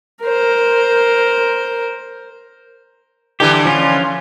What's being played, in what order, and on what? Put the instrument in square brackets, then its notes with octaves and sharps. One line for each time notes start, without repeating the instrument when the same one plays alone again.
[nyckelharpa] A#4 C5
[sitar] D3 E3 G3 [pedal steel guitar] G4
[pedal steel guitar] F3 C#4 F4